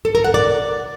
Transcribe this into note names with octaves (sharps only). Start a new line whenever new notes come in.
A4
A#4
F#5
D5